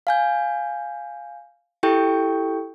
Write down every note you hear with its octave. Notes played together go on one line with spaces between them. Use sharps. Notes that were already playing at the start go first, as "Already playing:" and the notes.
F5 G#5 G6
E4 G4 A4 G5 C#6 G6